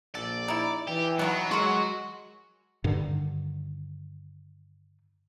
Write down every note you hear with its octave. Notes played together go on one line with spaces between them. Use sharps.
A#1 A4 D5
D#4 E4
E3 G4
B2 D#3 F#3 B3
G#3 F#4 A#4 C6
G2 D3 D#3